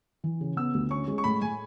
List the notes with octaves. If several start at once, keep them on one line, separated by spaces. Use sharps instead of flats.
E3
C#3
B3 E6
D2
C#4 C#6
G#3
C#6
A2 B5
A2 G#5